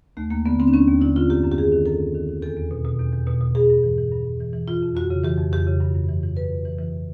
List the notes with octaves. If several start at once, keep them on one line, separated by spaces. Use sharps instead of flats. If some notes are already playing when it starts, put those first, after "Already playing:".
D#2 A3
D#2 A#3
D3 B3
D3 C4
D4
D#2 C#4
D#2
D3 E4
D3 F4
F#2 G4
F#2
G4
D#3 G#4
D#3
F#2 A4
F#2
D#3
D#3
E2 A4
E2
B2
B2
E2
E2
B2
B2
G2 G#4
G2
E3
E3
G2
G2
E3
E3
E3 F4
F2
F2 F#4
C#3
E3 G4
F2
F2 G4
C#3
G2
G2
E3
E3
G2 B4
G2
E3
E3